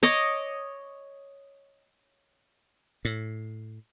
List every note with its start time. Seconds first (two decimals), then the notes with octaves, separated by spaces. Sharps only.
0.03 C#5 D#5 D6
3.05 A2